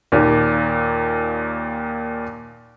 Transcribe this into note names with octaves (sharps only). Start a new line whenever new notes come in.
D#2 A#2